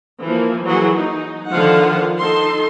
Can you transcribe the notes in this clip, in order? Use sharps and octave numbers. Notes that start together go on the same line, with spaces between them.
E3 F3 A#3
E3 F#3 G#4 F#5
D#4
D3 D#3 F3 F4 F5 F#5
D#4 A4 C6